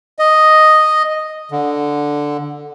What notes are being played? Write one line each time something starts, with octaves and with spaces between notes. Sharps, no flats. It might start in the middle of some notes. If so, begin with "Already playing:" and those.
D#5
D3